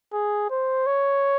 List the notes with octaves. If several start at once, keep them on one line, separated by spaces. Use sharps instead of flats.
G#4
C5
C#5